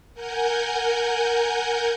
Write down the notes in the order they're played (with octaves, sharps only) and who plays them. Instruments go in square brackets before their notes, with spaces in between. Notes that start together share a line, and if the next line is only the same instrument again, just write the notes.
[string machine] A#4 F#5 G#5 G6